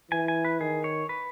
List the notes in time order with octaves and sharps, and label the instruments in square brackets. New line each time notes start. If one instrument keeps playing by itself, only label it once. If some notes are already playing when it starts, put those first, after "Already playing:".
[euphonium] E3 [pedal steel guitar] G#5
[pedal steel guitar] G#5
B4
[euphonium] D#3 [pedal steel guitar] G#4
[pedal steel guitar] C#5
B4